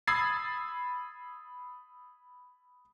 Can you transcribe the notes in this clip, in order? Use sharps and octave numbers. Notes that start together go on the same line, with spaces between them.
B5 D#6 E6 G#6 A6 C7